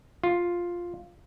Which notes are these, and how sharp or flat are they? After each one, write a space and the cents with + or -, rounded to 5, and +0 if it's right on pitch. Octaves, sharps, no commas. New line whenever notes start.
F4 +5